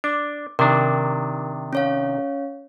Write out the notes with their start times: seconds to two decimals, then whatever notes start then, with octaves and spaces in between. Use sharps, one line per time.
0.04 D4 D6
0.59 C3 D#3 D4 A#4
1.73 C#4 C#5 F5